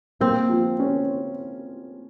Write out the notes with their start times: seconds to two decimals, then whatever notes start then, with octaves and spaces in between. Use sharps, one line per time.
0.20 A#3 C4
0.49 F3
0.79 C#4